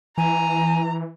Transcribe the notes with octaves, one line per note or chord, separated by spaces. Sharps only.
E3 G#5 A#5